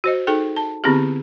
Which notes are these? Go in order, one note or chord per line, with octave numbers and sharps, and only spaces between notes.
F#4 C5 D#5
D#4 G#4 A4 G5
A5
D3 B3 C4 E4 G4 G#4